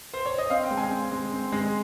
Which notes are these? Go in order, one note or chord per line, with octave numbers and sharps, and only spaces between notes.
C5
C#5
D#5
C4 F5
G5
G#3
G#5
C4
G#3
C4
G#3